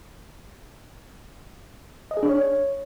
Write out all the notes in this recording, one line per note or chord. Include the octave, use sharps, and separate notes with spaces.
D#5
G#4
D4
C#5